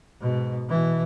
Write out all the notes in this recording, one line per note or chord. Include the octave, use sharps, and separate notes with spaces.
G#2 B2
B2 E3